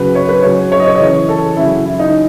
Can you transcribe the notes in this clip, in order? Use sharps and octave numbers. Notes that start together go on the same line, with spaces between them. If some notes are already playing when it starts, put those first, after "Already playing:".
Already playing: C#3 F#3 B4
C#5
B4
C#3 F#3 C#5
C#5
D#5
C#5
D#5
C#3 E3 C#5
A4
C#3 F#3 E4
E4
D#4